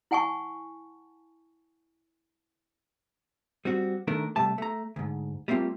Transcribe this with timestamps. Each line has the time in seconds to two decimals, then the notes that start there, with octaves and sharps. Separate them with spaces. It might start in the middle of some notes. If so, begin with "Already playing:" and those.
0.11 E4 F#5 G#5 A5 C#6
3.65 G3 C4 F#4
4.07 D#3 A3 D4 A#4
4.36 C3 G3 A3 A5
4.58 A3 A#5
4.96 D2 G#2
5.48 G3 A3 A#3 C4 F4